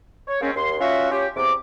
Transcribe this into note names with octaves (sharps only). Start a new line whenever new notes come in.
C#5
G#3 A#3 C4 C#4
D#2 C6
C#4 F4 F#4 E5
C#4 F4 G4
E2 C3 D6